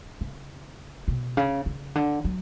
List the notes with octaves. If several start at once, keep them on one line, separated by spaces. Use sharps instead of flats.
C#3
B2
C#3
C#3
D3
F#3